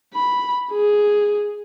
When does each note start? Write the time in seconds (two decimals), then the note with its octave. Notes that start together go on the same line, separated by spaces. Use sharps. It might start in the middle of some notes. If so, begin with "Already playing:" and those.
0.14 B5
0.72 G#4